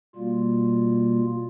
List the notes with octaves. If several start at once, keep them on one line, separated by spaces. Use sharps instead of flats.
B2 G3 A#3 F4